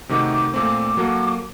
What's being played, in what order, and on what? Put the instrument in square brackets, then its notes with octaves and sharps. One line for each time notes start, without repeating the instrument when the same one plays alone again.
[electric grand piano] C3 D#3 A3 D#4 F#4 [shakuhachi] D6
[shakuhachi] D6
[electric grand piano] A#2 A3 C4 [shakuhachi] D6
[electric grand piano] F#3 A#3 F#4 A4